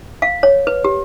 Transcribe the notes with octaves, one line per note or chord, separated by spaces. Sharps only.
F5
C#5
B4
G4